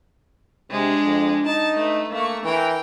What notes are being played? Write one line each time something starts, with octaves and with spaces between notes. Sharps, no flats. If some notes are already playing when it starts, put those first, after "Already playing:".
C3 G#3 D4
F2
D#4 A5
A3 B4
A3 A#3 C#6
E3 A#4 G5